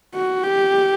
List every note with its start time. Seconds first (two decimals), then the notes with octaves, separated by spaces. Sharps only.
0.15 F#4
0.43 G4